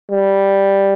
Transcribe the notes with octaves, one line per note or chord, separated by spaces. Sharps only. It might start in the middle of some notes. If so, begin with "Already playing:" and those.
G3